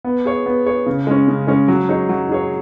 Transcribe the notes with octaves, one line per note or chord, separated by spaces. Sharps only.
B3
G#4 C#5
B3
G#4 C#5
C#3
G#3 C#4
C#3
G#3 C#4
F#3
D#4 G#4 C#5
F#3
D#4 G#4 C#5